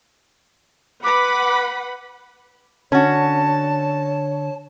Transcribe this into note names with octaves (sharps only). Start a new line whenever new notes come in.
B4 F#5 B5 D6
D3 C#4 F#4 C#5 A5